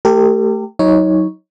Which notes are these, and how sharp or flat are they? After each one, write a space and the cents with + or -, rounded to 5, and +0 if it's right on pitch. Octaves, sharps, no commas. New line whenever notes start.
A3 +0 G4 +0 A#4 -45
F#3 +0 D#4 +25 C#5 +0